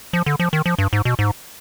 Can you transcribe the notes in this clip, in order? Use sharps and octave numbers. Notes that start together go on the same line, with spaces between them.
F3
D3
F3
D#3
F3
G2
G#2
B2
G#2